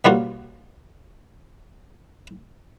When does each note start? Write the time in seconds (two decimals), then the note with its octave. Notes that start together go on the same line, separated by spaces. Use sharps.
0.05 B2 G3 A#3 C#4 F4 F#4